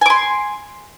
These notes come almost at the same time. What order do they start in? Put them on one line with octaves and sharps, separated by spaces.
G#5 D6 C6